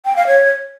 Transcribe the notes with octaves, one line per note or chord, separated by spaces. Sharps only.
G5
F5
C#5